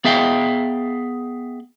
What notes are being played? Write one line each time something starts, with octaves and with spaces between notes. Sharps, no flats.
B3 G#4 E5 F5 G5